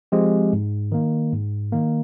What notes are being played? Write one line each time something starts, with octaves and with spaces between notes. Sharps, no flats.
F3 G#3 C4 G4
G#2
D#3 A#3
G#2
D#3 A#3